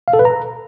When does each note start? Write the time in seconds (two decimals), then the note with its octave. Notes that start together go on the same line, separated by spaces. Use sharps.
0.08 F5
0.13 A4
0.19 B4
0.25 A#5